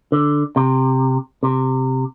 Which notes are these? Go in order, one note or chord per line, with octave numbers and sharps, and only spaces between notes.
D3
C3
C3